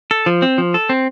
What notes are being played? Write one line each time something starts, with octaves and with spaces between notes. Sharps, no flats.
A4
F3
C4
F3
A4
C4